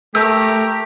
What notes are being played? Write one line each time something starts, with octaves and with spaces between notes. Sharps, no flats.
A3 G4 A#4 E6